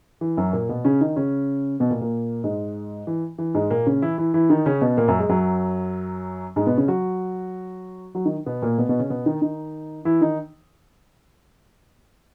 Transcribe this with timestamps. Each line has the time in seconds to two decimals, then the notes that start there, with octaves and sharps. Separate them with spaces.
0.21 E3
0.37 F#2 F#3
0.53 A#2 A#3
0.69 B2 B3
0.85 C#3 C#4
1.01 D#3 D#4
1.16 C#3 C#4
1.80 B2 B3
1.90 A#2 A#3
2.01 A#2 A#3
2.44 G#2 G#3
3.07 E3
3.38 E3
3.54 G#2 G#3
3.71 A#2 A#3
3.86 C#3 C#4
4.02 E3 E4
4.18 E3 E4
4.34 E3 E4
4.50 D#3 D#4
4.66 C#3 C#4
4.81 B2 B3
4.97 A#2 A#3
5.08 F#2 F#3
5.19 G#3
5.29 F#2 F#3
6.56 G#2 G#3
6.67 B2 B3
6.78 C#3 C#4
6.88 F#3 F#4
8.15 F#3 F#4
8.25 D#3 D#4
8.46 B2 B3
8.62 A#2 A#3
8.78 B2 B3
8.89 B2 B3
8.99 C#3 C#4
9.10 B2 B3
9.26 D#3 D#4
9.42 D#3 D#4
10.05 E3 E4
10.21 D#3 D#4